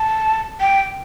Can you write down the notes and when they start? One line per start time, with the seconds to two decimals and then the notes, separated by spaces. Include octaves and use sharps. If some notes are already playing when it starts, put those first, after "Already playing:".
Already playing: A5
0.60 G5